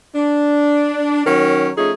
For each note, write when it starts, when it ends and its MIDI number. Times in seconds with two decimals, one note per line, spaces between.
0.15 1.23 62
1.26 1.69 51
1.26 1.69 54
1.26 1.69 61
1.26 1.69 70
1.77 1.92 53
1.77 1.92 57
1.77 1.92 61
1.77 1.92 63
1.77 1.92 68